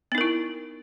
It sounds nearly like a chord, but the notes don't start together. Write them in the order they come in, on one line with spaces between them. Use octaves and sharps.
B3 D#4 A#4 E4